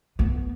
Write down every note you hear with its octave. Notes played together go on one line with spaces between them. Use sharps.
B3